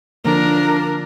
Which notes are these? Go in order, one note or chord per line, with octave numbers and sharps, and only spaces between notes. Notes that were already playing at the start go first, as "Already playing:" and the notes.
D3 F3 A#3 D4 A#4